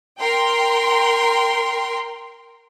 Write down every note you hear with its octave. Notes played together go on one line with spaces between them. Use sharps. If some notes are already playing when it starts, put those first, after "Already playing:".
A#4 G5 C6